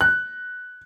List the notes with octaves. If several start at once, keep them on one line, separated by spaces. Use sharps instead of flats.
F#6